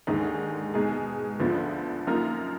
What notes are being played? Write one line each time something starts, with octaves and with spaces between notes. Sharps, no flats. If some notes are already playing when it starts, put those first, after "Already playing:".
D#2 D3 G#3 D#4
B2 G#3 D#4 G#4
D2 D3 F3 B3
F#2 F3 A#3 D#4 A#4